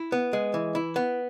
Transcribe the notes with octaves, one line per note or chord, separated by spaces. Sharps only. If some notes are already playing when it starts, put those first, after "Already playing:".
Already playing: E4
B3
G#3
E3
E4
B3